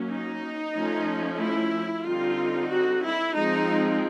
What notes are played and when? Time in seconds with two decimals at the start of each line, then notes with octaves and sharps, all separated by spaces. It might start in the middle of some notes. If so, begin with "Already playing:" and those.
Already playing: F#3 A#3 C#4
0.10 D#4
0.75 F3 A3 C#4
1.41 E4
2.05 D3 G3 C4 D#4 F4
2.71 F#4
3.04 E4
3.36 F3 G#3 C4 D#4